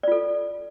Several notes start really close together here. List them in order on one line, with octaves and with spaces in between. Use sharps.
D5 F4 A4